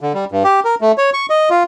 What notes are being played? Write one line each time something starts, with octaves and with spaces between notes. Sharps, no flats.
D3
G3
G2
G4
A#4
A3
C#5
C#6
D#5
F4